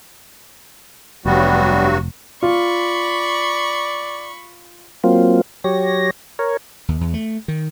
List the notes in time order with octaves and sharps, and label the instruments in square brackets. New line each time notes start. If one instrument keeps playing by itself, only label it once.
[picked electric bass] F1 [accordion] G2 F#3 F#4 [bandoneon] G3 B3
[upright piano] F4 [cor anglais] D5 [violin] B5 C#6
[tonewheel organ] F#3 A#3 C4 F4
F#3 G4 C#5 A#6
A#4 C#5
[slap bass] D#2
E2
A3
D#3